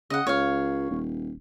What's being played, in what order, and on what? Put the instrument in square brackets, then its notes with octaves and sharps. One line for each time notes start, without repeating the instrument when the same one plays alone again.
[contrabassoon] C#3 [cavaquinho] D#5 F#5
[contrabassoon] C#2 [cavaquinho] C#5 F5
[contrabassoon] D#1